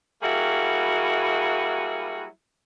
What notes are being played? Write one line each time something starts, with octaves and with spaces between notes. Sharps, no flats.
F#3 G3 A#3 E4 F#4 G#4